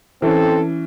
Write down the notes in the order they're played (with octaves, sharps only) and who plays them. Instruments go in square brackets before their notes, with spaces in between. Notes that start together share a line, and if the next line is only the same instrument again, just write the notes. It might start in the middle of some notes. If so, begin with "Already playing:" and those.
[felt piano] E3 C#4 [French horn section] C4 A4